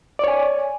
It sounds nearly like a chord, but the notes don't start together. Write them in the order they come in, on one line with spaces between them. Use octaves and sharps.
D5 C#5 G#5